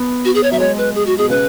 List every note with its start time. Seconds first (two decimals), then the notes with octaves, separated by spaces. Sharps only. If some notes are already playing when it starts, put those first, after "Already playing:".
Already playing: B3
0.25 F#4
0.35 G#4
0.43 C#5
0.52 F#3 E5
0.60 G#3 C#5
0.78 B4
0.95 G#4
1.06 F#4
1.18 B2 G#4
1.30 C#3 B4